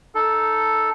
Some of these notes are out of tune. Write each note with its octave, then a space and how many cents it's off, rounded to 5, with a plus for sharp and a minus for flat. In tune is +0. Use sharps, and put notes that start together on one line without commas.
D#4 +0 A4 +0